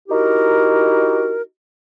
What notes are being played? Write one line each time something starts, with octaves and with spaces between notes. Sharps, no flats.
D#4 E4 F#4 G4 A#4